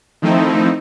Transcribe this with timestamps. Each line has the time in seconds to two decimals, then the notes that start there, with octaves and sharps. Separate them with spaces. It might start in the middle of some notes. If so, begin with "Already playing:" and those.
0.22 D#3 F3 A3 C4 D#4 E4